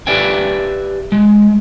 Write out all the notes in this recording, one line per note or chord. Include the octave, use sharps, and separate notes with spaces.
G4 B4 D5 E5 G5 G#5
G#3